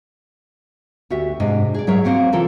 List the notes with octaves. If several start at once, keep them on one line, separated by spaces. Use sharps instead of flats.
D2 F#4 G4 E5
G#2 C3 D4 D#5
G#4 D5
G#2 F#3 G#4 A#4 C#5 E5
A#3 C4 F#4 F#5
C3 E3 F4 A4 A#4